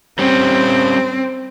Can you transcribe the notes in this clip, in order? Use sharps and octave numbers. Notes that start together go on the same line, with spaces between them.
G3 C4 C#4